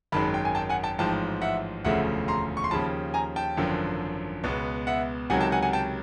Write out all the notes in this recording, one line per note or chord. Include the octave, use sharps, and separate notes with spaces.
G#1 F#2 D#3 G#3 A5 B5
G5
G#5
G5 A5
F#5 G#5
G5 A5
A1 G#2 F3 G5 A5
E5 F#5
E1 D2 C#3 F3 A3 E5 F#5
A#5 C6
C#6
C6
D#2 C#3 F3 A5 B5
G#5 A#5
G5 A5
G#1 F#2 D3 F3
C#2 B2 G#3 B3
E5 F#5
C#2 C3 D#3 F#3 F#5 G#5
G5 A5
F#5 G#5
F#5 G#5
G5 A5